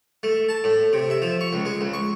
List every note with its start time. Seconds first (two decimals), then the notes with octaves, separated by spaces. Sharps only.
0.23 A3
0.49 A5
0.64 A2
0.93 C3
1.10 E5
1.22 F3
1.41 C#6
1.53 C#2
1.66 G#3
1.81 C#2
1.94 C#6